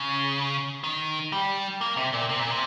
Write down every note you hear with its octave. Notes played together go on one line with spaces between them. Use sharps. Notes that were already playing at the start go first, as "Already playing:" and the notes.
Already playing: C#3
D#3
G3
A#3
C3
A#2
C3
A#2
C3